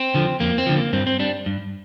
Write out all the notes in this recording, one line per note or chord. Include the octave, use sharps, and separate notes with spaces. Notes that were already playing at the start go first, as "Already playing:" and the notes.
Already playing: C4
D3 F3
F2 A#3
C4
D3 F3
A#3
G2 C4
C4
G3 D4
G2